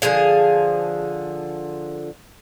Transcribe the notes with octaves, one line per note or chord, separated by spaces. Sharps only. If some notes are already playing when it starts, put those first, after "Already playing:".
D3 F3 G#4 F5